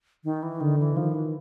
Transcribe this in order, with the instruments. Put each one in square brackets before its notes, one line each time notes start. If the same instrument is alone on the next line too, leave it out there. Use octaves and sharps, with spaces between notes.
[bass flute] D#3
E3
[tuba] D3 [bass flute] D#3
[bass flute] E3
[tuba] D#3 [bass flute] F3
[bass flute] E3